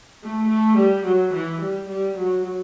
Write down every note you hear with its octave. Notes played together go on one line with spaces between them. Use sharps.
A3
A3
G3
F#3
E3
G3
G3
F#3